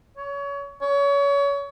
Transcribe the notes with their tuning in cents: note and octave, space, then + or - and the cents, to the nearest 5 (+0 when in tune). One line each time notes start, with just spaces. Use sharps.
C#5 +25
C#5 +30